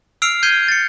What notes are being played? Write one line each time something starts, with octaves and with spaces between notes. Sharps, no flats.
E6 F6 C7 D7 F7
G6 G#6 C7 D#7 G7
A6 C#7